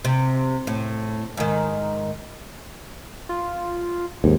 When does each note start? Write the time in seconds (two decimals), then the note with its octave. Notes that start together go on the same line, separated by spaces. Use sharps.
0.05 C3
0.67 A2
1.37 G#2 D#3
3.29 F4
4.24 D#2 G#2